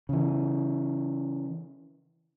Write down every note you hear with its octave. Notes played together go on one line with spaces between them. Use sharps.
C#3 E3